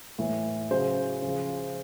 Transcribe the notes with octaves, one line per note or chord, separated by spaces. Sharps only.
A2 E3
C#3 F#3 C5
C#3 F3